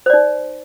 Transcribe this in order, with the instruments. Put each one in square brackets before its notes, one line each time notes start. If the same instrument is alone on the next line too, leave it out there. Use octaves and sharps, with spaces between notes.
[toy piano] C5
D5
D#4